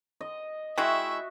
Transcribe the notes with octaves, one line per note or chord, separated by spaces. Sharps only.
D#5
G#3 E4 F#4 E5 G5 C#6